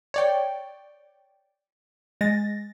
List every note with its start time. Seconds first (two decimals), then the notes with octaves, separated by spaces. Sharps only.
0.14 C#5 D5 G5
2.21 G#3 A6 A#6